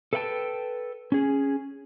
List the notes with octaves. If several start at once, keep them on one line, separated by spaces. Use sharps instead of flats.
A4 B4 E5 F#5 G5 A5
C#4 G#4